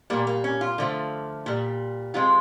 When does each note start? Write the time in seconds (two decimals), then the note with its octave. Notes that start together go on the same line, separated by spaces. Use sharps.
0.10 A#2 G3 A#3
0.27 A#3
0.44 C#4
0.61 F4
0.78 D3 F3 A3
1.46 A#2 G3
2.14 C3 F3 G#3 F4